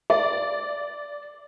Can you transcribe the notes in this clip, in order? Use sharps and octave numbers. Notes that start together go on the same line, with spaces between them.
D5